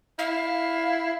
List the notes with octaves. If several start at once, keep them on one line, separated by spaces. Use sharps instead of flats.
E4 F5